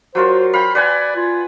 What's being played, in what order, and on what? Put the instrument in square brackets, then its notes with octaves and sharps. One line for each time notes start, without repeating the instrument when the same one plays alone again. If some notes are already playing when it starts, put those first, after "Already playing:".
[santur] F#3 F4 A#4 [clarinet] C5
[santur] F5 G5 [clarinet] B5
[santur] B4 F#5 G#5 [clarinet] D5
[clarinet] F4